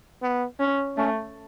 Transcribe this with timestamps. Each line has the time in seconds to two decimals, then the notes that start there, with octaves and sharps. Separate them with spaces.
0.22 B3
0.60 C#4
0.97 A3 C#4